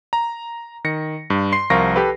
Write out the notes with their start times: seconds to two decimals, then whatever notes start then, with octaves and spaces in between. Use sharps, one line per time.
0.13 A#5
0.84 D#3 A#6 C#7
1.30 G2
1.52 C6 C7
1.70 C2 F3 F4 A#4 C#6 A#6
1.96 G4 A4 B4